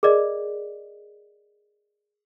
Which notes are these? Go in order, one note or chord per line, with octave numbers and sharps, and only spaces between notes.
G#4 A#4 D5 D#5